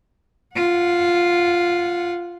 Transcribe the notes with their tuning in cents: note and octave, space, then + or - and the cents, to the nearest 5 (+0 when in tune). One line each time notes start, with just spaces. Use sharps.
F4 +0 F#5 -25